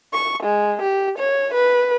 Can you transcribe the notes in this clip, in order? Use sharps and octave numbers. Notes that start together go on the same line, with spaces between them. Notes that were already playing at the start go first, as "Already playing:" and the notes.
C#6
G#3
G4
C#5
B4